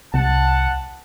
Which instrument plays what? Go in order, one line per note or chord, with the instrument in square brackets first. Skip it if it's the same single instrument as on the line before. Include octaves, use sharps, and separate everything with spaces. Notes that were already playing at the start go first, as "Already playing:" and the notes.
[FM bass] C2 [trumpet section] F#5 A5